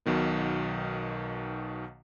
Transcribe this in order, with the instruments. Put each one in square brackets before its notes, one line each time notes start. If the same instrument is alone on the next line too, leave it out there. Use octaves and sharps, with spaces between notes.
[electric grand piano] B1 B2 D#3 B3